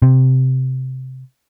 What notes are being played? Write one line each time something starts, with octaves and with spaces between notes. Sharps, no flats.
C3